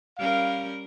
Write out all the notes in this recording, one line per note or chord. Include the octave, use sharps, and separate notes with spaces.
G3 C#4 A#4 F5